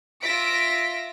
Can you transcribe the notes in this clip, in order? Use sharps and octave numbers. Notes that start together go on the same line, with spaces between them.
F4 E5 A#6 B6 D7